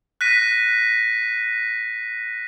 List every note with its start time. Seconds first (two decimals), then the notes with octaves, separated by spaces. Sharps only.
0.21 F#6 A#6 B6 D#7